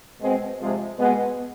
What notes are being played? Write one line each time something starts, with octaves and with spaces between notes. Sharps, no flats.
B2 G#3 C4
C3 F3 G#3
B2 G#3 B3